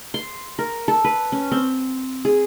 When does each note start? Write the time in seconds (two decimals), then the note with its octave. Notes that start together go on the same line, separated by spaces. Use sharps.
0.14 C6
0.59 A#4
0.88 A4
1.04 B4
1.32 C#4
1.51 C4
2.25 G#4